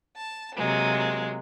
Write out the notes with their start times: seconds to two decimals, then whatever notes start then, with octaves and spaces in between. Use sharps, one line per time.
0.17 A5
0.56 C3 F#3 G#3 A#3